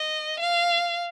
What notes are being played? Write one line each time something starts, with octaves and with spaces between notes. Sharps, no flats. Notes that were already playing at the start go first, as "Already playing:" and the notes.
Already playing: D#5
F5